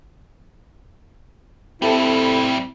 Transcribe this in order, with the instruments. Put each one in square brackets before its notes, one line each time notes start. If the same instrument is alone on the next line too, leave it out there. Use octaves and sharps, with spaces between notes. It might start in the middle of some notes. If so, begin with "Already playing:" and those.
[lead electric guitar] A2 G3 [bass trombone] C4 [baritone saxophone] E4 [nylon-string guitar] G4 A4 E5